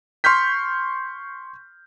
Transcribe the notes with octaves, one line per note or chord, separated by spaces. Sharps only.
C6 C#6 F6 G6 B6